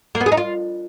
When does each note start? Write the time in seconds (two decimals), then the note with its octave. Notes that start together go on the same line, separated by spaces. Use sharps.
0.15 A#3
0.21 B3
0.26 G#4
0.32 D#4
0.37 F4